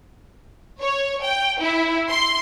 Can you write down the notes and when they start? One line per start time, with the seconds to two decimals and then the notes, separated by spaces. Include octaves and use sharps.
0.82 C#5
1.24 G5
1.62 E4
2.10 C6